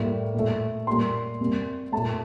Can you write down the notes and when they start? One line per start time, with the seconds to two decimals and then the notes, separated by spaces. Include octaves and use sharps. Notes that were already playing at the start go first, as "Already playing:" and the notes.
Already playing: A2 G3 A#3
0.34 A#2 A3
0.87 A#2 G3 A#3 C6
1.41 C3 G3 A#3
1.92 A#2 A3 A5